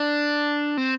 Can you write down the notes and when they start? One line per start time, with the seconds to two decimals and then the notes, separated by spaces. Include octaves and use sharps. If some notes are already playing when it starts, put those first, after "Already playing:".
Already playing: D4
0.77 C4